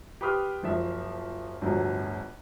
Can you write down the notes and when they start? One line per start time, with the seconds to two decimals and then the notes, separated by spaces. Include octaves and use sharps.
0.21 G4 B4 B5 C6 D#6 F6
0.63 F#1 F3 E5
1.61 G1 D2 A2 F3 F#3